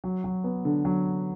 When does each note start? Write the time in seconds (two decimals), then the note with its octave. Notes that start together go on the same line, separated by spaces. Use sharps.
0.04 F#3
0.24 F#3
0.44 B3
0.65 D3
0.85 F#3